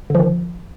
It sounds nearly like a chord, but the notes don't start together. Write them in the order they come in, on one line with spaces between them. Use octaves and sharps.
D3 F3 D#3